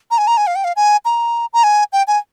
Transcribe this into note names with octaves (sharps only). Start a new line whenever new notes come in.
A#5
G#5
A#5
G#5
F5
G5
F5
G#5
A#5
A#5
G#5
G5
G#5